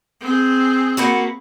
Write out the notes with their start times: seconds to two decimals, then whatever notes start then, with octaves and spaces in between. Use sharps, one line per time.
0.21 C4 G#4
0.97 A#3 B3 F#4